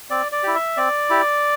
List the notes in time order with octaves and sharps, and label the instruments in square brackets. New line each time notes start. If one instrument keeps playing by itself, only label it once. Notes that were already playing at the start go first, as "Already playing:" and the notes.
[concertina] C4 D5
D5
E4 G4
E5
C4 D5
E4 G4